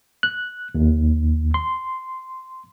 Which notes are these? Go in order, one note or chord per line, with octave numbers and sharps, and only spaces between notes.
F#6
D#2
C6